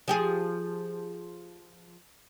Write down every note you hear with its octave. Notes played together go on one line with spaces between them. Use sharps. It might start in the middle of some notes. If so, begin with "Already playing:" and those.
F3 G4 G#4